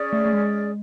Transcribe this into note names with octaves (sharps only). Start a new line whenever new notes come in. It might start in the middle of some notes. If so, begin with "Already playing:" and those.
Already playing: C#4 G#4 D5
A3
A3
G#3